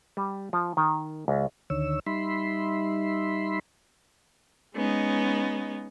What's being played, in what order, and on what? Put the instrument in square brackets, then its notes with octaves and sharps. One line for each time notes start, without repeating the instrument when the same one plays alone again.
[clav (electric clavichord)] G3
F3
D#3
C#2
[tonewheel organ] D2 D3 D#3 C#5 E6
G3 D#4 E5 B5 C6
[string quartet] G#3 B3 C#4 D#4